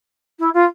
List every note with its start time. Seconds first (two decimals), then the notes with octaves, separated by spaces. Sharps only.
0.39 E4
0.53 F4